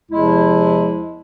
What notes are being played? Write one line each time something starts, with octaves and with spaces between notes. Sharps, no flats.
E2 C3 F3 G#3 E4